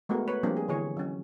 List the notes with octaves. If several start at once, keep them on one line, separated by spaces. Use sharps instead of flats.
G#3 A3 B3 F#4 A#4
B4 C#5
F3 G3 A#3 C4 D4
G#4
D3 E3 G#4 C#5
F#3 C#4